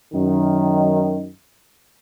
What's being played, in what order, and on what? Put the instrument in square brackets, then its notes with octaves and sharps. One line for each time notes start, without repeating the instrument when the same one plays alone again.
[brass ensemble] F#2 D#3